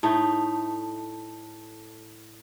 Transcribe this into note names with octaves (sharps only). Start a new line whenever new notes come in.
A2 A3 D#4